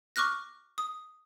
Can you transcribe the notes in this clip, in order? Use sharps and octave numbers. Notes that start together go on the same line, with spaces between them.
C#6 D6 F6 F#6 A#6
D#6